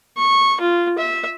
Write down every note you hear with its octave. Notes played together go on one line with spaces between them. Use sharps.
C#6
F4
E5